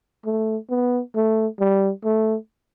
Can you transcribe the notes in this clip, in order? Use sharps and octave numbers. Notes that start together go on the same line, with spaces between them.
A3
B3
A3
G3
A3